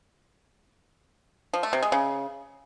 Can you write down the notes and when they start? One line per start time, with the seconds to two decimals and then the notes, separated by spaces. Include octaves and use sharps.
1.53 F3
1.63 A3
1.73 C3
1.82 G#3
1.92 C#3